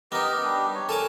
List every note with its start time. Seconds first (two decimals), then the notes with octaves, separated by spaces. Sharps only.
0.12 B3 D#4 G4 A#4 D#5
0.44 G3 D4 G4
0.75 C#5
0.89 A4 A#4 G#5 D6